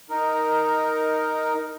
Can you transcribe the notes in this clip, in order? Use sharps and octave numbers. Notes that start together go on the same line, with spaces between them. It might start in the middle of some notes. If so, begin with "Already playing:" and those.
D#4 A#4